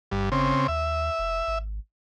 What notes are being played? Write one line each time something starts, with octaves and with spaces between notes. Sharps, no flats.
G1 G2
C#3 C4
D#2 E5
F1
G#1